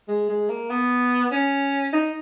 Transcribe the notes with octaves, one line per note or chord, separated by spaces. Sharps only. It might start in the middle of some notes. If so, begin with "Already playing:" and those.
G#3
G#3
A#3
B3
C#4
D#4